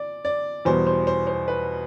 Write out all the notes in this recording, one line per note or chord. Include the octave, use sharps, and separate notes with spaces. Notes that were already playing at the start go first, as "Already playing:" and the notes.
Already playing: D5
D5
E2 B2 G3 C5
C5
C5
C5
B4